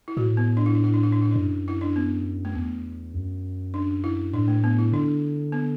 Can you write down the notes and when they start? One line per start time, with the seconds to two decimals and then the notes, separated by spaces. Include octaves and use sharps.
0.08 E4
0.17 A2 F#4
0.37 B3
0.57 D4
0.66 E4
0.75 D4
0.84 E4
0.94 D4
1.03 E4
1.12 D4
1.21 E4
1.31 F#2 D4
1.68 E4
1.81 D4
1.96 B3
2.45 A3
2.55 E2 B3
3.14 F#2
3.74 D4
4.04 E4
4.33 A2 D4
4.48 A3
4.64 B3
4.79 E4
4.93 D3 D4
5.52 B3